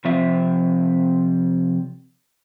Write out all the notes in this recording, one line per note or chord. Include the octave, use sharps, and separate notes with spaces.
C3 F3 C4 F4 E5